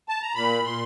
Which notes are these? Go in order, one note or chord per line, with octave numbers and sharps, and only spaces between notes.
A5
A#5
A#2 B5
A#2 C6